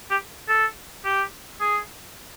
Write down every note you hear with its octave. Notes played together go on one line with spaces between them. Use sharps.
G4
A4
G4
G#4